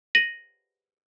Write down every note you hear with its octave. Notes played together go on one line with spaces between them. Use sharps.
A#6 D#7 F#7